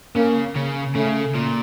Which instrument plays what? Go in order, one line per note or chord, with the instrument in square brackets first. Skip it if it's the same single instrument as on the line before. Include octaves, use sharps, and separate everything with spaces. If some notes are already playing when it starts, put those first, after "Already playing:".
[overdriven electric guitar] C#3 [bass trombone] A#3
[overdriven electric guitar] C#3
[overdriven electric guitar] C#3 [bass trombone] A3
[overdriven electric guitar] A#2